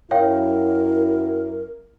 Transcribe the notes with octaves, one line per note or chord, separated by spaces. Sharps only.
F#2 E4 A#4 C#5 F5 G5